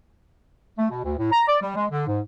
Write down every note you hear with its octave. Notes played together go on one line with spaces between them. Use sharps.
A3
B2
D2
A2
A#5
D5
G3
G#3
D3
G#2